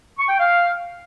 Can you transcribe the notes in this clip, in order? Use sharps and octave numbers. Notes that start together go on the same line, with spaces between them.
C#6
G5
F5